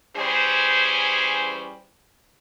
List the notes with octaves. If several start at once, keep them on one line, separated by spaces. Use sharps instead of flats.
E3 G3 C#4 G#4 C5